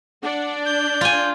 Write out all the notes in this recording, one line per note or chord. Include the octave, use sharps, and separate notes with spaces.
D4 D5 F#5
G6
F4 G#5